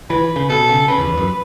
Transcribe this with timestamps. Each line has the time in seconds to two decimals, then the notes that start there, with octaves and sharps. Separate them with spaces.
0.10 E3 B4
0.36 C#3
0.49 B2 A4
0.69 C#3
0.88 C#3 B4
0.98 E2
1.08 E2
1.17 F#2
1.27 B4